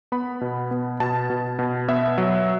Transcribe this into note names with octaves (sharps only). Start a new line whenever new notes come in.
B3 B5
B2
B3
B2 A5
B2
B2
B3 E5
F#3